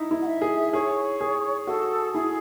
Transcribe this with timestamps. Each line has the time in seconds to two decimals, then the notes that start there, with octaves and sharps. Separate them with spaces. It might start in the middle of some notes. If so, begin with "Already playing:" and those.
Already playing: D#4 E4
0.11 E4
0.21 F#5
0.27 E5
0.42 G#4
0.73 G#4 C#5
1.21 G#4
1.67 F#4 A4
2.13 E4 G#4